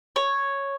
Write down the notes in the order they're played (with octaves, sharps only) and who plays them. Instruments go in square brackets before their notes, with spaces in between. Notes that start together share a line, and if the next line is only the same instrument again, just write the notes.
[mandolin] C#5